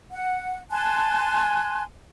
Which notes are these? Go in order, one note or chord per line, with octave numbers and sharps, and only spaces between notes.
F#5
G#5 A5 C6 F#6